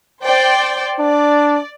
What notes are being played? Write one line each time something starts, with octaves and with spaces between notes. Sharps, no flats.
C5 D5 G5
D4 D5